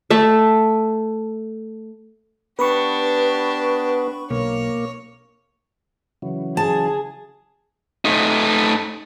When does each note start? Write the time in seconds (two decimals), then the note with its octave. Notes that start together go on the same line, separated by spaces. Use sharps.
0.10 A3 E5 A5
2.59 B3 D4 G4 B4 B5 C#6
4.31 B1 A#3 C#5
6.22 C#3 E3 F#3
6.57 G#4 A5
8.05 A3 D#4